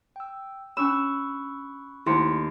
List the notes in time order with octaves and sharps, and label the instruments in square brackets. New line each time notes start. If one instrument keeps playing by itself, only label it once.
[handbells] G5 E6
[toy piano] C#4 D4 C#5 [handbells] B5 C#6 F#6 [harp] E6
[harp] D#2 [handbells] A3 C5 A5 [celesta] E4 C6 C#7